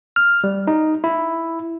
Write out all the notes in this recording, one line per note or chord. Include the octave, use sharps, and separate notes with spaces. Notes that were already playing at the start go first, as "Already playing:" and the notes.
F6
G3
D#4
E4